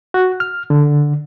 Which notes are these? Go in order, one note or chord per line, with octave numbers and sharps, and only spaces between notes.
F#4
F6
D3